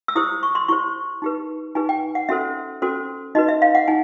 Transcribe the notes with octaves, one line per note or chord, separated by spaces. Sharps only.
E6
E4 G4 C5 D#6
C#6
C6
E4 G4 C5 C#6
D#4 G4 B4
D#4 G4 B4 G#5
G5
F#5
C#4 F#4 A4 C5 E5
C#4 F#4 A4 C5
D#4 F#4 B4 D#5
E5
F5
F#5
D#4 G#5